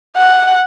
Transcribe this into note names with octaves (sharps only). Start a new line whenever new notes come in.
F#5